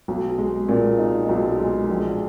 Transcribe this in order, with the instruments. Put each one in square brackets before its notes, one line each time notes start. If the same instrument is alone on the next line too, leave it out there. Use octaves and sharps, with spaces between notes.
[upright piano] B1
G#3
A#2
D#4
B1
G#3
A#1